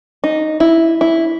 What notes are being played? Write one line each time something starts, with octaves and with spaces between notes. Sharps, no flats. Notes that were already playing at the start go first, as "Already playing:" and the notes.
D#4
E4
E4